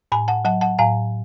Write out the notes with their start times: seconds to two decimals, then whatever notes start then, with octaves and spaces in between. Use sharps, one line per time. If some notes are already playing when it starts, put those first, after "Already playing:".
0.12 A2 G#5 B5
0.28 F#5 A5
0.45 F#3 F#5 A5
0.61 F#5 A5
0.79 A2 F5 G#5